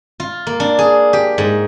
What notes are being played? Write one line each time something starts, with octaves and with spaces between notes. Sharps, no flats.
F4
A#3
D4
G#4
G4
G#2